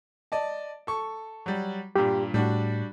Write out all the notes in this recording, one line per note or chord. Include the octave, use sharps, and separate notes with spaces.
D5 D#5 A5
A4 C#6
F#3 G3
G2 A#2 G4
A2 G3 D4 F#4